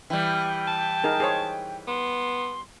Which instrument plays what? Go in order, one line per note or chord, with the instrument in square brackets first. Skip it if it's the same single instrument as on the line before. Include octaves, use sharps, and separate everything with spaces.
[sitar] E3 G3 [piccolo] G5
[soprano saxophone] A5
[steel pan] D#4 G#4 A#4
G#4 C5 C#5
[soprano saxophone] B3 [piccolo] C6